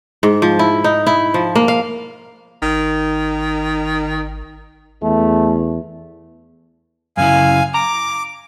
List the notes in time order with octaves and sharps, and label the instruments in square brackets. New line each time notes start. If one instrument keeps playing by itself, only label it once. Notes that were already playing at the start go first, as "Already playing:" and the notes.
[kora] G#2
F3
E4
D#4
E4
F3
A#3
F5
[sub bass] G#1 [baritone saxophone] D#3
[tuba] E2 [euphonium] A3
[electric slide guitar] F#2 C#3 E4 [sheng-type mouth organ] F5 G#5
[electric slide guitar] A#5 [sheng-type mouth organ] D6